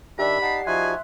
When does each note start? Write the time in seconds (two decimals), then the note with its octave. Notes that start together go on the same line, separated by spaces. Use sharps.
0.19 D#3 D4 G4 D5 E5 B5
0.42 D#4 F#5 A5 C7
0.67 F3 D#4 F#4 E5 G#5 C6 F#6